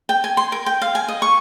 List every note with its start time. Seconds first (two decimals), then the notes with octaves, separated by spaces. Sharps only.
0.09 G5
0.24 G#5
0.37 C6
0.52 A#4
0.66 G5
0.81 F5
0.95 G#5
1.08 D#5
1.22 C#6